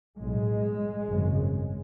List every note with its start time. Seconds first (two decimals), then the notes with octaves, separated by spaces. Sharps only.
0.20 B1 A2 G#3
1.07 G#1 F#2 C#3